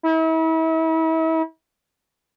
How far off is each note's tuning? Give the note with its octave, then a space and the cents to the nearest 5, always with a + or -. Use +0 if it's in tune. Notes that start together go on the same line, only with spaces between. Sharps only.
E4 -40